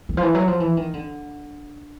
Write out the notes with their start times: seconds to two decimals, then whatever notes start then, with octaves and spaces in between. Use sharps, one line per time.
0.09 D#3
0.17 F3
0.23 E3
0.35 F#3
0.48 F3
0.60 E3
0.77 D#3
0.94 D3